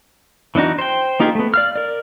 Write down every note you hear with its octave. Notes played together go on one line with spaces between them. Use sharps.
E3 B3 D4 D#4 F#4
C5 G5
A#3 D#4 F4 G4 G#4
A3 B3
D5 F5 F6
A#4 D5